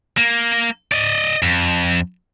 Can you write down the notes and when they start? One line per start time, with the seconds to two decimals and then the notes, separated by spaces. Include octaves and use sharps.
0.17 A#3
0.92 D5 D#5
1.43 F2